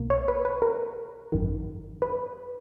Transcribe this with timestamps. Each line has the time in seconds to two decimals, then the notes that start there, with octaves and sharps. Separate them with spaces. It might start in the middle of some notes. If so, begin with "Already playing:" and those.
Already playing: B1 B2 A#3
0.10 C#5
0.28 B4
0.45 B4
0.62 A#4
1.32 G#1 F#2 D#3
2.02 B4